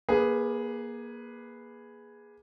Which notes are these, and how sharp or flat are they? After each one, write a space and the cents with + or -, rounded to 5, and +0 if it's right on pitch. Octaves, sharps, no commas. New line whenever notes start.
A#3 +25 G#4 +0 B4 +0